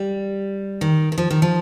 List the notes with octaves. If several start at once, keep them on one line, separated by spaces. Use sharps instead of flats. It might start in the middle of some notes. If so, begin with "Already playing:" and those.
Already playing: G3
D#3
D#3
F3
D#3
F3